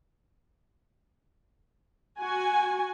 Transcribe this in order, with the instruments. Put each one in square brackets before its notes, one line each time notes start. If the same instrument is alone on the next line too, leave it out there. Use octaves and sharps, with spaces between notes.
[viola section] F#4 G#5